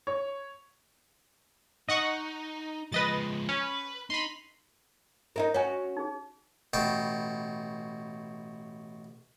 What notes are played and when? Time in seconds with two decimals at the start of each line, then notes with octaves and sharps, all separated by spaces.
0.07 C#5
1.88 D#4 D#5 F#5 C#6
2.92 F3 G#3 B4 D#5 A6
3.49 C#4 B4
4.10 D#4 B5 C6
5.36 D#4 E4 A#4
5.54 C#4 F#4 C#5 G#5
5.97 D#4 G#4
6.74 A1 B2 G5 A5